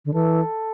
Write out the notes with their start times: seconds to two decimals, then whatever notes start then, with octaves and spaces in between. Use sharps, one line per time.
0.05 D3
0.13 E3 A4